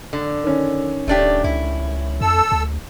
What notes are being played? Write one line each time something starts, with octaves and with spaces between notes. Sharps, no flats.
D3
D#3 C#4
D1 A3 D4 G4
C#2 E4
F2 A4 E6
D2